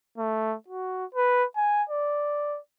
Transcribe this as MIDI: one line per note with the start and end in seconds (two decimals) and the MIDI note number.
0.18 0.55 57
0.68 1.05 66
1.14 1.45 71
1.56 1.83 80
1.90 2.58 74